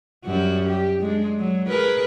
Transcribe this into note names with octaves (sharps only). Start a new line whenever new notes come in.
F#2 G3 F#4
G4
G#3 D4
F#3
G#4 A#4 B4